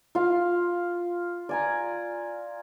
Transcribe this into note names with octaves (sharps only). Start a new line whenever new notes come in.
F4 F5
D5 G#5 A#5